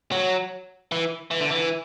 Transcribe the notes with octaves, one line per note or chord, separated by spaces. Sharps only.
F#3
E3
E3
D3
E3